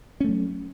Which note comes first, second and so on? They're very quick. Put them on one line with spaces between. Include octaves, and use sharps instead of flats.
C#4 A3 F#3